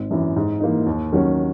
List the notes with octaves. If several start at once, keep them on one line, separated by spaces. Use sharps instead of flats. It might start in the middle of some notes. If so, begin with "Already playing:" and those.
Already playing: G#1
F#2 E3
G#2
E3 A#3 D#4
D#2
D#3 F#3 C#4